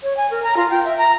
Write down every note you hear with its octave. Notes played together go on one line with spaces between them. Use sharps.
C#5
G#5
A#4
A#5
F4
G5
E5
A#5